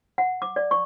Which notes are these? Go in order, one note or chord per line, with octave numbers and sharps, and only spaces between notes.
F#5
D6
D5
C#6